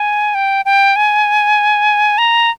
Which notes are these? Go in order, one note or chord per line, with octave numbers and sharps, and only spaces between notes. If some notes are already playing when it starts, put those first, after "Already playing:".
Already playing: G#5
G5
G5
G#5
A#5